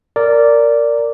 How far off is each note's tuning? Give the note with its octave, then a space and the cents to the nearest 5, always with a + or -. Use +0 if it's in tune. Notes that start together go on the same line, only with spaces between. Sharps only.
A#4 -15 D5 -10